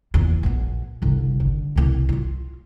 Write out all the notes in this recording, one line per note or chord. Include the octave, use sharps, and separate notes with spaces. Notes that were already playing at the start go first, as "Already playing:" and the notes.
E2 A#2
A#1 B3
G1 C2
D3
C2 B2
D#4 F4